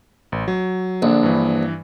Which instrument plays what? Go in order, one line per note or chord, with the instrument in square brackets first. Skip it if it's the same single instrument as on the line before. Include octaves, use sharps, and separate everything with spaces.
[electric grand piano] A1
F#3
[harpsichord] A#1 [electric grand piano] D3 D4
[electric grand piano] G2 E3